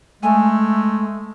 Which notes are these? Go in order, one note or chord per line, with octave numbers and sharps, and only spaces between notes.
G#3 A3 G#5